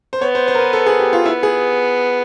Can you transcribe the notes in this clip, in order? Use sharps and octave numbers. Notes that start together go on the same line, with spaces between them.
C5
B3 C#5
C5
C5
A#4
B4
A4
G#4
G4
F4
B3 E4
G#4